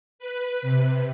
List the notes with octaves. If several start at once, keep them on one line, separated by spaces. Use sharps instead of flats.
B4
C3